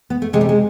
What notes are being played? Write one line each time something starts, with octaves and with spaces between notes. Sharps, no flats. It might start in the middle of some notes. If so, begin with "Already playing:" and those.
B3
A3
C3 G#3
G3
G#3